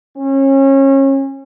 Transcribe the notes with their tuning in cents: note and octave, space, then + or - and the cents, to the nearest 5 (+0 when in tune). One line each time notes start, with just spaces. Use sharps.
C#4 -30